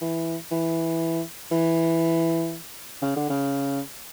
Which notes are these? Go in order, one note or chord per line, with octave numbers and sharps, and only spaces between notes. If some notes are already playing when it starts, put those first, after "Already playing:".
E3
E3
E3
C#3
D3
C#3